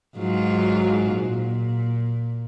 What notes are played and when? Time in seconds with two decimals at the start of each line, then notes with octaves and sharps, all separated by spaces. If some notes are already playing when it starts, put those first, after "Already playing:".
0.17 G#2 F#3 F4
1.13 A#2